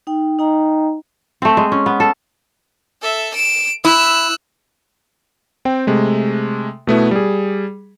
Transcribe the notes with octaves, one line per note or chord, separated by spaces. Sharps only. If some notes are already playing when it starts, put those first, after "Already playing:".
D#4 G5
D#4 D#5 G5 A#5
A3 C4
G#3
C#4
B3
A4
A4 E5
D7 E7
E4 E6 F#6
C4 G5
C3 G#3 A3
B2 A3 B3 E4
G3 G#4